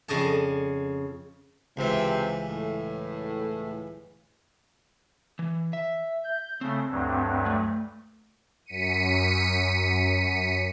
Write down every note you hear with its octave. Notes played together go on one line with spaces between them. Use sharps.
F2 C#3 D5 D#5 A5
C#2 C3 E3 C4
A2
E3
E5
G6
C#3 A3 C4
D2 G2 F#3
A3
F#2 B6 C#7 D#7